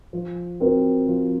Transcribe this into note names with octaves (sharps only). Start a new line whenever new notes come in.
F3
C4 F#4 A#4
F3